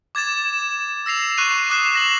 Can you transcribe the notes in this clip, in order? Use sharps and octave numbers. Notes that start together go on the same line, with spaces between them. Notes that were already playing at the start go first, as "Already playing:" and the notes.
D6 G#6 A6 E7
E6 A#6 C7 F7
C#6 F#6 C7 D#7 F7
D6 D#6 F#6 C7 E7
A#6 F#7